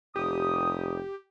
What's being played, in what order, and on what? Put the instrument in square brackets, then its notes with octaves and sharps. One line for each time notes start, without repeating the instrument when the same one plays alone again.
[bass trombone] F1 [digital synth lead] G4 [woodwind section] D#6